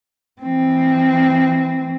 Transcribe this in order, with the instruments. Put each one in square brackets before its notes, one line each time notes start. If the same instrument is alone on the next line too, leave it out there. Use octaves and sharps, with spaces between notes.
[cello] E3 C4